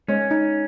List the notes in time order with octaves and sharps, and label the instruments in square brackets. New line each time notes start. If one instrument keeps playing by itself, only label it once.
[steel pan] G#3 [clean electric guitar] C#4
[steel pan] D#4